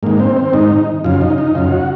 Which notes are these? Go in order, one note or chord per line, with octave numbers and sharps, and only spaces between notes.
G#2 D#3 A#3
C4
C4
G#2 D#3 D#4
F#2 C#3 F4
D#4
D#4
F#2 C#3 F4
F#4